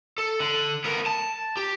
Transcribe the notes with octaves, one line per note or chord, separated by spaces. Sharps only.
A4
D3
B3 A#4
A5
G4